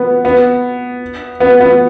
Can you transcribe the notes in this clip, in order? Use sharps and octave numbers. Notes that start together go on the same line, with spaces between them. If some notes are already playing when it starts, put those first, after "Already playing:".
Already playing: B3
B3
B3
B3